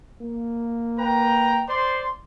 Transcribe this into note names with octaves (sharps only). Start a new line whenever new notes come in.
A#3
B4 G5 A#5
C5 D5 C6